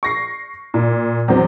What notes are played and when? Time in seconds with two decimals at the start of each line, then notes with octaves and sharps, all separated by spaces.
0.03 C#6 A#6 C7
0.74 A#2
1.28 E2 F#3 C4